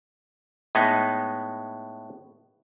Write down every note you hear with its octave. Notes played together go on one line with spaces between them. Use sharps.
A2 G#3 B3 D#4